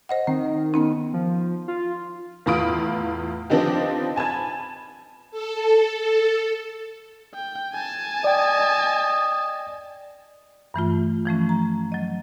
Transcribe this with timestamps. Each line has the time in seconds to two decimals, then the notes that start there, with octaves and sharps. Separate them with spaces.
0.09 C5 D#5 F#5
0.27 D#3 C4
0.74 B3 C#4 D#4
1.14 F3
1.68 F4
2.46 E2 A2 F4 B5 D#6 D7
3.50 F3 B3 C4 D4 D#4 G4
4.16 G#5 A5 B5 G#6
5.31 A4
5.99 A4
7.35 G5
7.73 G#5 A5
8.24 D5 D#5 G5
10.74 G2 E3 A3 F4
11.26 E3 F3 A3 C#4
11.49 A#5
11.92 F#3 D#5